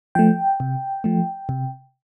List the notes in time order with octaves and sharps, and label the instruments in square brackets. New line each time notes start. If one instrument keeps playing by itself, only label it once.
[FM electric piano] F3 A3 G5
C3
F3 A3
C3